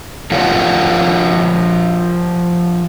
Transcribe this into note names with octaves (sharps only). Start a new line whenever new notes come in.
F3 F4 A#4 C#5 F5 F#5